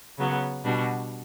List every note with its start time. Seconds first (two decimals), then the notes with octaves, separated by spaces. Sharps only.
0.18 C#3 F#3 B3
0.64 B2 G3 D4 F#4